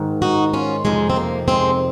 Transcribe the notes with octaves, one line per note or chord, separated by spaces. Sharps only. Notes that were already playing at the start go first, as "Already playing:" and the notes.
Already playing: G#2 D#3
D#4 F#4
C#4 F4
F2 C3 D#3 G#3
C4
A#3
G#3 C4